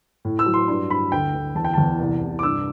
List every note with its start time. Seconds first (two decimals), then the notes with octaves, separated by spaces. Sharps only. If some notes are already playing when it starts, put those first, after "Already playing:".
0.25 A2
0.39 E6
0.46 F#3
0.54 C6
0.68 G2 C6
0.90 G2 B5
1.12 D2 G5
1.34 D2
1.55 E2 A5
1.65 G5
1.74 E2 A5
1.99 C2
2.21 C3
2.39 D6
2.43 G2 E6